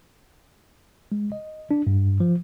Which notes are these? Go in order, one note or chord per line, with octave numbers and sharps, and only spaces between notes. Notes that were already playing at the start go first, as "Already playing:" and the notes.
G#3
D#5
D4
G2
F3